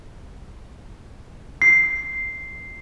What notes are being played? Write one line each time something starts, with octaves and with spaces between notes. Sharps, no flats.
C7